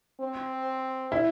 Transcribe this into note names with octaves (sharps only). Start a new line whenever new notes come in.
C4
E4